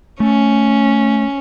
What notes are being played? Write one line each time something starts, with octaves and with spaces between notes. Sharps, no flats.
A3 C#4